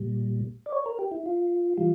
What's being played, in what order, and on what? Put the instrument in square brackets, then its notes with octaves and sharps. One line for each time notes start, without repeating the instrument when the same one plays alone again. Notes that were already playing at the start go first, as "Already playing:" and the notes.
Already playing: [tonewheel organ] A#2 G3
D5
C#5
A#4
G4
E4
F4
E3 G3 F4